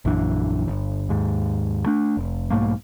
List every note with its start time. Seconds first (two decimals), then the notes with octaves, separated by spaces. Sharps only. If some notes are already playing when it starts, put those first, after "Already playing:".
0.05 A#1 F#2 E3 D4
0.68 G1
1.09 D#2 G#2
1.86 A3 D4
2.17 F1
2.50 B1 G#2 A3 A#3